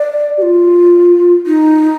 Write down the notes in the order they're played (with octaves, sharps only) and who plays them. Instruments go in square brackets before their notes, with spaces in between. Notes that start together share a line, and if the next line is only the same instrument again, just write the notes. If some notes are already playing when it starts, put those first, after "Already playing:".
Already playing: [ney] D5
G4
F4
D#4